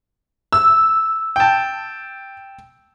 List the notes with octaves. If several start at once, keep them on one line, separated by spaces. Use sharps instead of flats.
E6
G5 A5